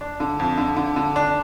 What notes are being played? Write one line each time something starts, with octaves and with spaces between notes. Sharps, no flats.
D4
D3
F2
D3
D3
D3
D4